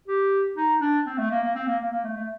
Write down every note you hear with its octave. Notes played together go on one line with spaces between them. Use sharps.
G4
D#4
D4
C4
A3
A#3
A#3
C4
A#3
A#3
A#3
A3
A3